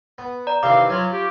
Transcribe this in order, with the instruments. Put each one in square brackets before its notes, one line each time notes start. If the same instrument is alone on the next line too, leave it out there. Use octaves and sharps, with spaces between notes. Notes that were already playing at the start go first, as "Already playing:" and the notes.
[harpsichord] B3
[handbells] D5 A#5
[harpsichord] C3 D#3 E3 [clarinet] F5 [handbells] D6
[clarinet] F#3 [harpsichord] C#4 F4
[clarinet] G4